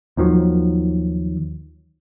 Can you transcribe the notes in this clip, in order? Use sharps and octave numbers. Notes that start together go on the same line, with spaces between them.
D#2 D#3 F3 F#3